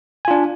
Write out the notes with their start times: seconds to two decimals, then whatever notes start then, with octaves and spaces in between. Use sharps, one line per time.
0.25 G#5
0.28 F4
0.31 D4